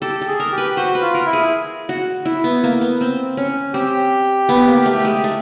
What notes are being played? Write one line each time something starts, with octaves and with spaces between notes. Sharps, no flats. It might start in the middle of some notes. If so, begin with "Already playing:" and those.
G4 A4
A4
G#4
A#4
G4
B4
F#4 C5
B4
F4
A#4
E4
G#4
F#4
E4
B3
A#3
B3
C4
C#4
C4 G4
B3
A#3
A3
G#3
A3